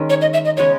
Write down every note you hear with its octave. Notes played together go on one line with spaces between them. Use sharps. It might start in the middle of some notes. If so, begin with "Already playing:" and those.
Already playing: D#3 G#3 C#4
C#5
D#5
E5
D#5
C#3 G#3 B3 C#5